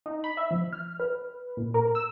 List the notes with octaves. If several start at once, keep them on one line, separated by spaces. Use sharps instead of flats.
D#4
B5
E5
F3
F6
B4
A#2
A#4
E6